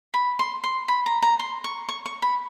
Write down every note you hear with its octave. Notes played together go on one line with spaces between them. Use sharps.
B5
C6
C6
B5
A#5
A#5
C6
C#6
C#6
C#6
B5